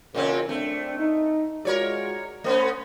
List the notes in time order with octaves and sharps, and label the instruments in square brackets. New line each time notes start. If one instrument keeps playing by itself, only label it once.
[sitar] A#2 C4 C#4 [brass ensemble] C#3 E3 A#4
[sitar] A3 [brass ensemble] C4 D4
[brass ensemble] D#4
[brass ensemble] G#3 F4 F#4 [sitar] A#4 C#5 D5
[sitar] A3 B3 C#4 [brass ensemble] C5